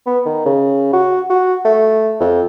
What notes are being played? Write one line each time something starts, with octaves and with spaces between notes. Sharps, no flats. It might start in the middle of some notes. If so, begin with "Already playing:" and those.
B3
D#3
C#3
F#4
F#4
A3
F2